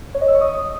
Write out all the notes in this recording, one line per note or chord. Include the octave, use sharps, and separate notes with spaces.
C#5
D#5
E6
C#6
D#6